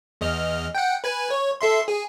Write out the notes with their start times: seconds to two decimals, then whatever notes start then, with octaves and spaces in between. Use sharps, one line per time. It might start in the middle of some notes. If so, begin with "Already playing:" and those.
0.21 E2 D#5 F6
0.75 F#5 G5
1.04 B4 G#5
1.30 C#5
1.61 A4 E5 C6
1.88 G#4